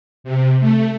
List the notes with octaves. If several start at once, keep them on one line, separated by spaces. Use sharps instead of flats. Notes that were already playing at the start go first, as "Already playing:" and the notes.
C3
A3